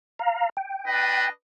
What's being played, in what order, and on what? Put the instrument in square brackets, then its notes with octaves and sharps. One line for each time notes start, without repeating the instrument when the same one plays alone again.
[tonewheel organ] F5 A#5
G5
[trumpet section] D4 B4 D#5